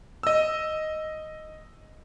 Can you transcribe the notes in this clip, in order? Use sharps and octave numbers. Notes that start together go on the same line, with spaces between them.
D#5 E6